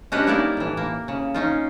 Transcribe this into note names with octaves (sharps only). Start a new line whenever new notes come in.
C#4 D4 F#4 G4 B4 D#5
G3 A#3 D#4 E4 A#4 D5
A2 E3
A#3
C#3
C#4 D#4 F4